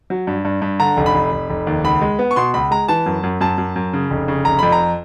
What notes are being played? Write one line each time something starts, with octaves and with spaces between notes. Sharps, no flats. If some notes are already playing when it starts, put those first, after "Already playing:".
F#3
G2
G2
G2
D3 A#5
F1
B5
F1
F1
F1
D#2
C#2 B5
G#3
B3
C#6
B2 C6
C#2 B5
G#3 A#5
E3 A5
F#2
F#2
F#2 A5
F#2
F#2
C#3
F1
C#3
F1 A#5
F2 B5
A#5